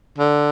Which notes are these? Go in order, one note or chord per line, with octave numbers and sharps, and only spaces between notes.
D3